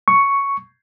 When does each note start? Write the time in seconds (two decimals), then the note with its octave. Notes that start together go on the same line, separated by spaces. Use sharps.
0.08 C#6